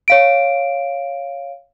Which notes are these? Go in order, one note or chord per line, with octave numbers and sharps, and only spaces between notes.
C#5 F5 D7